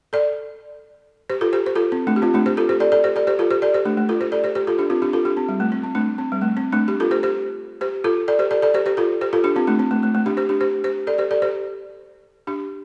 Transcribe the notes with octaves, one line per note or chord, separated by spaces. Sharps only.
A4 D5
G4 C5
F4 A4
G4 C5
C5
F4 A4
C4
A3 D4
G4
C4 F4
A3 D4
G4 C5
F4 A4
G4 C5
A4 D5
A4 D5
G4 C5
A4 D5
G4 C5
F4 A4
G4 C5
A4 D5
G4 C5
A3 D4
A3
F4 A4
G4 C5
A4 D5
G4 C5
G4 C5
F4 A4
D4 G4
C4 F4
D4 G4
F4 A4
D4 G4
C4
G3
A3
C4
C4
A3 D4
C4
G3
A3
C4
A3 D4
D4 G4
F4 A4
G4 C5
G4 C5
G4 C5
F4 A4
A4 D5
G4 C5
A4 D5
A4 D5
G4 C5
G4 C5
F4 A4
G4 C5
F4 A4
D4 G4
C4 F4
A3 D4
C4
A3
A3
A3
D4 G4
G4 C5
D4 G4
G4 C5
G4 C5
A4 D5
G4 C5
A4 D5
G4 C5
D4 G4